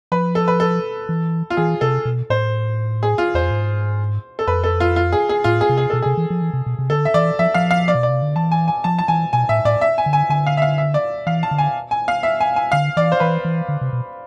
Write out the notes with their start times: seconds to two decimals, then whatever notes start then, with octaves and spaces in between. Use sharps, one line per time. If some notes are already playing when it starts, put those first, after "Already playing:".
0.12 F3 B4
0.35 A4
0.48 B4
0.60 A4
1.09 E3
1.50 F4
1.57 E3 G#4
1.81 C3 A4
2.05 B2
2.30 A2 C5
3.03 G#4
3.18 F4
3.34 E2 C5
3.43 F2
3.51 G#2
4.39 A4
4.47 F2 B4
4.64 A4
4.80 F4
4.96 F4
5.12 G#4
5.29 G#4
5.44 A2 F4
5.61 G#4
5.69 C3
5.78 G#4
5.90 B2 A4
6.02 C3 G#4
6.17 E3
6.30 F3
6.42 E3
6.53 C3
6.66 B2
6.79 C3
6.90 D3 A4
7.05 E5
7.14 E3 D5
7.39 F3 E5
7.54 F3 F5
7.71 F5
7.88 D5
7.95 B2
8.03 D5
8.09 C3
8.22 D3
8.36 E3 A5
8.51 G#5
8.68 G#5
8.84 F3 A5
8.99 A5
9.08 E3 G#5
9.33 B2 G#5
9.49 A2 E5
9.65 A2 D5
9.81 E5
9.98 G#5
10.06 D3
10.13 G#5
10.30 D3 G#5
10.47 F5
10.57 E5
10.62 F5
10.78 E5
10.94 D5
11.27 E3 F5
11.43 A5
11.51 D3
11.58 G#5
11.91 G#5
12.08 F5
12.23 E5
12.40 G#5
12.56 G#5
12.72 D3 F5
12.97 E3 D5
13.12 C5
13.20 E3 B4
13.45 E3
13.69 D3
13.81 C3
13.93 B2